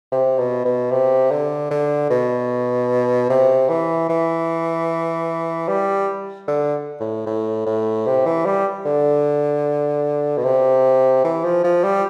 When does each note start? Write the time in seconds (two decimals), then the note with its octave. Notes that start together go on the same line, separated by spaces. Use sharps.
0.12 C3
0.38 B2
0.65 B2
0.91 C3
1.31 D3
1.71 D3
2.10 B2
3.30 C3
3.69 E3
4.10 E3
5.68 G3
6.47 D3
7.00 A2
7.26 A2
7.66 A2
8.06 C3
8.26 E3
8.45 G3
8.85 D3
10.38 B2
10.44 C3
11.24 E3
11.44 F3
11.64 F3
11.83 G3